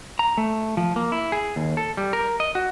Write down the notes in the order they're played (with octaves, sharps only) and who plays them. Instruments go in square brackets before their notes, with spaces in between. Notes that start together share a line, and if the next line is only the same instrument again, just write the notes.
[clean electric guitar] A#5
A3
F3
A#3
E4
G#4
D#2
A4
G3
A#4
D#5
F#4